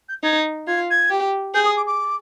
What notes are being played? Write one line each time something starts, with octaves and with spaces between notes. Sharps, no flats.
G6
D#4 G#6
F4 G#6
G#6
G4
G#4 G6
D#6
D6
D6